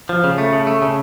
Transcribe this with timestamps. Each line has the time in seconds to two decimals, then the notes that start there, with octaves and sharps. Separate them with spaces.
0.09 F3
0.24 C#3
0.38 A3
0.53 C#3
0.67 A3
0.82 C#3